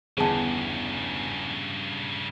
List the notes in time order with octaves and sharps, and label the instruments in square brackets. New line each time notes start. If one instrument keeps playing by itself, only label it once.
[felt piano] G1 E2 [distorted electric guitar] G2 C#3 [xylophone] G#4 A5